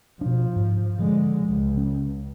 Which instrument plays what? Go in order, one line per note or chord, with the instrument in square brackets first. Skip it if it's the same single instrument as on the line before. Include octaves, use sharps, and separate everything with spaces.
[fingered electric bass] B2 D4 [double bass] F3
[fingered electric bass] G#2
[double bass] D3 G#3 [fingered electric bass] F3
[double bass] C#2
[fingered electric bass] C#4